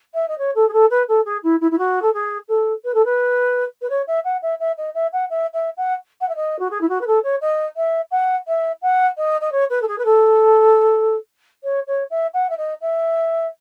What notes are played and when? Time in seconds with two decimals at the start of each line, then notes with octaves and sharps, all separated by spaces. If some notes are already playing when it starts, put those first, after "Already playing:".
0.13 E5
0.28 D#5
0.38 C#5
0.55 A4
0.68 G#4
0.72 A4
0.90 B4
1.08 A4
1.25 G#4
1.43 E4
1.60 E4
1.70 E4
1.78 F#4
2.01 A4
2.13 G#4
2.48 A4
2.84 B4
2.93 A4
3.05 B4
3.81 B4
3.89 C#5
4.07 E5
4.24 F#5
4.42 E5
4.59 E5
4.77 D#5
4.94 E5
5.12 F#5
5.29 E5
5.53 E5
5.77 F#5
6.20 F#5
6.28 E5
6.35 D#5
6.59 F#4
6.70 G#4
6.80 E4
6.88 F#4
7.00 B4
7.06 A4
7.23 C#5
7.41 D#5
7.76 E5
8.11 F#5
8.47 E5
8.81 F#5
9.17 D#5
9.40 D#5
9.51 C#5
9.69 B4
9.81 A4
9.87 G#4
9.98 B4
10.04 A4
11.63 C#5
11.87 C#5
12.10 E5
12.33 F#5
12.49 E5
12.57 D#5
12.81 E5